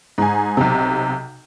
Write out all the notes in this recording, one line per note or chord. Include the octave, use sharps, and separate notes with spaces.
G#2 G#5
B1 C3